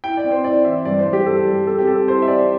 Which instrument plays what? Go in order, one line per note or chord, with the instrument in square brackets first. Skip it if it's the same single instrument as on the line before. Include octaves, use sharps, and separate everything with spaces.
[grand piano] E4 G5
D5
C4
C5
E4 D5
E3 E5
G2 D5
C5
G2
G4
G2 A4
G3
C4 A4
G4
C4 A4
E4 C5
E5
C4 D5